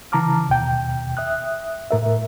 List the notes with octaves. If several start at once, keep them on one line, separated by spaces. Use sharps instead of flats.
C#3 E3 A5 A#5 D6 F6
D#2 B2 G5
E5 D#6 F#6
A2 A#4 E5